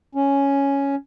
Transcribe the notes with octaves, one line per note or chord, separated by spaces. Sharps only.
C#4